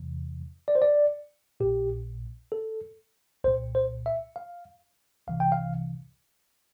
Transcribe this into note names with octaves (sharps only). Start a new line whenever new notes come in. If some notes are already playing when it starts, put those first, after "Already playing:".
Already playing: E2 C3 E3
D5
C5
D5
A#1 A#2 G4
A4
C2 A#2 C5
C5
E5
F5
C2 C3 E3 F5
G5
F5